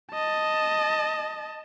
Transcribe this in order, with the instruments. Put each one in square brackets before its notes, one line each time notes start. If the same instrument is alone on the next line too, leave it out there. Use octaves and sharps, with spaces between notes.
[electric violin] D#5 A5